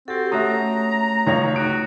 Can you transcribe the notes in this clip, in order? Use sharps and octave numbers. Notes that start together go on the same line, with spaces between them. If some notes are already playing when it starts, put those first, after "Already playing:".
C4 F#4 G4 A4
A3 C#4 F#4 E5 A#5 D#6
C#2 D#4 C#5 F7
F#4 D7